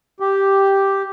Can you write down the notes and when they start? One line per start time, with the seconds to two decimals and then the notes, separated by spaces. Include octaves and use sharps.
0.20 G4